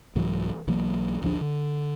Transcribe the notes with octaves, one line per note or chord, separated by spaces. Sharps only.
C2 G#2 E3 F#3
B1 E3 F#3 A#3
A1 D2 F3 D4
D3